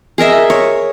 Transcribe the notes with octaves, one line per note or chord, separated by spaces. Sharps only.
G#4 A#4 D#5 E5
C#5